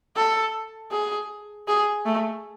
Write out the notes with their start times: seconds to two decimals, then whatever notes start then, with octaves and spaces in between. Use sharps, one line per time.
0.17 A4
0.91 G#4
1.68 G#4
2.06 A3